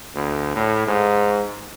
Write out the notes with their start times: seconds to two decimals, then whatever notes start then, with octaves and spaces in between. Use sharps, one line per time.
0.15 D2
0.56 A2
0.87 G#2